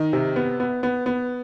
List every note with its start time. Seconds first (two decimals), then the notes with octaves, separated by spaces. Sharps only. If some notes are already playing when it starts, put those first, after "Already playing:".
Already playing: D#3 D#5
0.13 C3
0.36 B3
0.60 B3
0.83 B3
1.06 B3